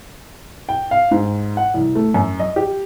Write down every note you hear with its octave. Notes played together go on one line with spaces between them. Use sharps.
G5
F5
G#2
F#5
C2
A3
F#2
D#5
G4